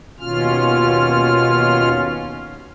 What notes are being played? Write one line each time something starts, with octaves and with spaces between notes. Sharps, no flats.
D#2 B2 C#4 F4 F6